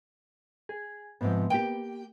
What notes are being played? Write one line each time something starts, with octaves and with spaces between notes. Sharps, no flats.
G#4
G#2 C3 F3 B3
A#3 G4 G5